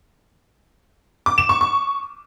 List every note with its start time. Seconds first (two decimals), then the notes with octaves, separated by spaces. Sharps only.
1.26 D6
1.38 E7
1.49 C#6
1.61 C#6